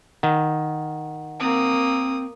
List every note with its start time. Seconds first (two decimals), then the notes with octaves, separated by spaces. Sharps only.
0.23 D#3 F#5
1.40 A#3 C4 D#6